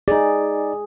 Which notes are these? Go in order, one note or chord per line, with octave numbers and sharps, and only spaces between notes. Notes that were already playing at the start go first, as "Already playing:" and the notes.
D#4 G#4 D5